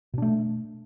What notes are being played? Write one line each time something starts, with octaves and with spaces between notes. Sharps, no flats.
B2 A3 D4